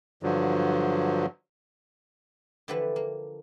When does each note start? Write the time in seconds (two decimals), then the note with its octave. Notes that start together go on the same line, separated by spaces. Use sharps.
0.23 G2 D3 F3 F#3
2.68 D3 E3 F3 G4 A4 B4
2.96 A#3